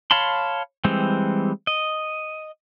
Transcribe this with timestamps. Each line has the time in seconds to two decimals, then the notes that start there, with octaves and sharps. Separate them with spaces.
0.11 C#5 F5 A5 B5 C6
0.84 E3 G3 G#3 C4
1.67 D#5